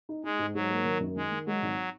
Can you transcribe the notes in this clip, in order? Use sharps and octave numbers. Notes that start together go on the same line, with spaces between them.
D#4
G#3 D#4
G#2
G#2 F#3
A#3
D#3
F#2
D#3 G#3
D#3
F#3 G#3
G#1